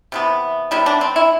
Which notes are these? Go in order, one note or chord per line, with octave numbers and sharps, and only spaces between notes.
C3 E3 B3
C3 G3 B3 E4
D4
C4
E4